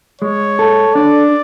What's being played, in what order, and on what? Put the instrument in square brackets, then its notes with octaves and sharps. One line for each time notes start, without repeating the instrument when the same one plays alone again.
[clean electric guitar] G#3 [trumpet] C#5
[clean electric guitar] A4
[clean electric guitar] D4 [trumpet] D5